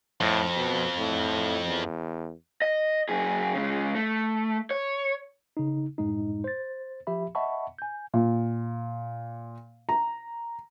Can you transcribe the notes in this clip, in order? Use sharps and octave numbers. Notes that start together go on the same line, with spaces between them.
F2 A2
B2
A2
E2
D#5
F#2 G#4
C#3 G#3
A3
C#5
C#3 D#4
F#2 A2 G#3 D#4
C5 A6
F3 G4 E5 B5
D#5 E5 F#5 A5 B5 C#6
G#5 G6
A#2
A#5